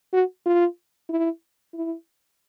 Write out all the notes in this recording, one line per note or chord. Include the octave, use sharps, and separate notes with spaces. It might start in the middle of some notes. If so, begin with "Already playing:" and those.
F#4
F4
E4
E4